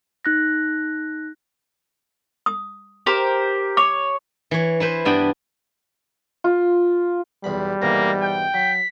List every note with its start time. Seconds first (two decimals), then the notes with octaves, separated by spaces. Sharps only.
0.25 D#4 F#6 A#6
2.46 D#6
3.06 G4 A#4 C5
3.77 C#5 D6
4.51 E3 C#5
4.80 E4 B4 C5
5.05 G2 B3 D4 G5
6.44 F4
7.44 B1 E2 G3 B5
7.82 G#2 B2 E3 A#3 A#6
8.22 G5 G6
8.54 F#3 B6